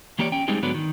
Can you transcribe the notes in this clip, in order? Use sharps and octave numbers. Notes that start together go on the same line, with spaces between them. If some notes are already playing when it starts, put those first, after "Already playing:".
E3 A#3 G4 C#5 D5
C#4 G5
G3 G#3 C4 D#4 G#4
G#2 D3 F#3 B3 B4 D5
D#3